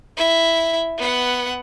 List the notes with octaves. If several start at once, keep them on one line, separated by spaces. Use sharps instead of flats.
E4 E5
B3 F#5